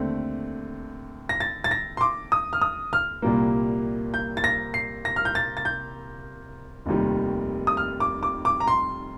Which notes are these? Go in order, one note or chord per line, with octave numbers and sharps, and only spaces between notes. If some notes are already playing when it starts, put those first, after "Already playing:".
Already playing: D#2 D3 A3 C4
A#6
A6
A6
A#6
C6
D6
D#6
F6
D#6
F6
C2 A#2 G3 A#3
G6
A6
A#6
C7
A#6
F6
G6
A6
A6
G6
F1 D#2 D#3 G3
D#6
F6
D6
D6
D6
A#5
C6